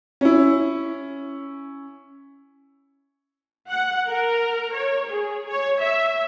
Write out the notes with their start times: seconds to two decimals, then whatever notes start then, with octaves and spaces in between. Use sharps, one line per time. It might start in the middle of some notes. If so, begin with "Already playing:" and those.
0.21 C#4 E4
3.70 F#5
4.07 A#4
4.73 C#5
5.09 G#4
5.48 C#5
5.80 E5